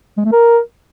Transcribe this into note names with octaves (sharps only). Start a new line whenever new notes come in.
G#3
A3
A#4